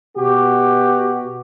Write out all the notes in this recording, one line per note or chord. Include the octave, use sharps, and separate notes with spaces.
B2 F#4 G4